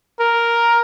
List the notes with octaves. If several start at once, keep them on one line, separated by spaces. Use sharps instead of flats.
A#4